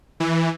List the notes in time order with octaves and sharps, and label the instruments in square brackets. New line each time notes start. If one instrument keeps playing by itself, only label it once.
[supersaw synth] E3